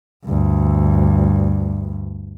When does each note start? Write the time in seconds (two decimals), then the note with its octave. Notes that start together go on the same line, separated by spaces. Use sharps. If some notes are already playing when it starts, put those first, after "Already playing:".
0.25 D2 G2